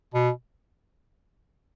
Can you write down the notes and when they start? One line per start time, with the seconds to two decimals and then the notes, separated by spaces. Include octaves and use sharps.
0.14 B2